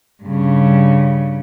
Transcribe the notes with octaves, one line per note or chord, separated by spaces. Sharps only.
G2 C#3